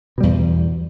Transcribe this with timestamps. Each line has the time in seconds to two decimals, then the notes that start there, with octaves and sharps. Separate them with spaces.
0.18 B2
0.21 G3
0.23 E2